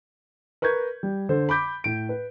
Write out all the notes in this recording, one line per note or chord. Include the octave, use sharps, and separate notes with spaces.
A#4 B4 C#6 G6 G#6
G3
D3 A4 C5
B5 D6 G6 B6
A2 D7
B4